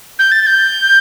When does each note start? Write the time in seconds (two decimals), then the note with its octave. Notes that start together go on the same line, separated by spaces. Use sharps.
0.19 G6
0.32 A6
0.42 A6
0.47 G6